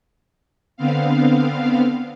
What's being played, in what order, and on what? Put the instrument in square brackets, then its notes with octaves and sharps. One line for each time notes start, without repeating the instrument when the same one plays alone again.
[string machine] D3 B3 C4 F5